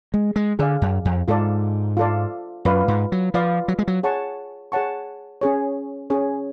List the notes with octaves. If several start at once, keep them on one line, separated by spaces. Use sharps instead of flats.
G#3
G#3
D3 G#4 D5 F5
F#2
F2
G#2 F4 A4 D5
F4 A4 D5
F#2 F4 B4 D5 F5
G#2
F#3
F3 F4 B4 D5 F5
F#3
G#3
F#3
G#4 C#5 F#5 A5 C#6
G#4 C#5 F#5 A5 C#6
C#4 G#4 C#5
C#4 G#4 C#5